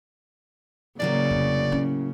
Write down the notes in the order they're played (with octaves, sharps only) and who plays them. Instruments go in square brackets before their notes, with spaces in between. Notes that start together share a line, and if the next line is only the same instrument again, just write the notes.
[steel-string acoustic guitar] A2 F#3 A#3 [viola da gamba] C#3 [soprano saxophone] D5
[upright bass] F1
C#4 E4